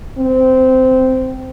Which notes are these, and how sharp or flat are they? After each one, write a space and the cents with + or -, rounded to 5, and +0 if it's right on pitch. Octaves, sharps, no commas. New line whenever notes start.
C4 -15